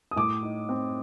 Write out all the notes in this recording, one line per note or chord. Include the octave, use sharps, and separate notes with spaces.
D#6
A2 D6
D#4
C4